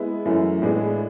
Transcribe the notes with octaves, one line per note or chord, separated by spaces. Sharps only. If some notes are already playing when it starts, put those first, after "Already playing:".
Already playing: G#3 B3 E4
F#2 E3 A3
A2 G#3 B3 D4 G#4